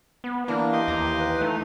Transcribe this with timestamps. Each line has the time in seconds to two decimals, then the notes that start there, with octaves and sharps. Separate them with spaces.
0.24 B3
0.48 E3 A#3 D4 A#4
0.73 G4 D#5 C6
0.88 D#2 A#5
1.17 B4
1.41 A3 D#4